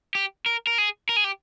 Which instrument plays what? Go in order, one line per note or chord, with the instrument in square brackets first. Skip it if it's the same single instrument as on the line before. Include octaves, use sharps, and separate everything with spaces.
[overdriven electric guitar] G4
A#4
A#4
G#4
A#4
G#4
G4